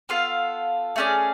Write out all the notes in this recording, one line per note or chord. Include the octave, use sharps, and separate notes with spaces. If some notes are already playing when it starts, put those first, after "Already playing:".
B3 F4 A4 F5
A3 C#4 G#4 D5